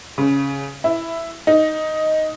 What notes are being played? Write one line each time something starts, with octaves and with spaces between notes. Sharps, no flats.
C#3
E4
D#4